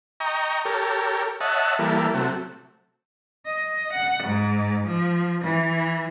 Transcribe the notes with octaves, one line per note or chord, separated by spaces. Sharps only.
D#5 G5 A#5 C#6
G4 A4 A#4 C#5
C#5 D#5 E5 F#5 A5
E3 G3 A#3 A4
C3 F#3 A3
D#5
F#5
G#2
F3
E3